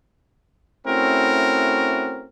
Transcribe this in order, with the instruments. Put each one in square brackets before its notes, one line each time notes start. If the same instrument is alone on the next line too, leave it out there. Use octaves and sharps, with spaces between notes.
[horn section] A3 C4 C#4 E4 F#4 A#4